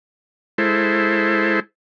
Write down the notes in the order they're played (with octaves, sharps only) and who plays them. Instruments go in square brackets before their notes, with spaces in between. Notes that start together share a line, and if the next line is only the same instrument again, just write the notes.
[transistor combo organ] G#3 E4 A4 C5